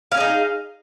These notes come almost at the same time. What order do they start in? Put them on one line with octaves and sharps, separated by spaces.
F5 C#4 G#4 D#4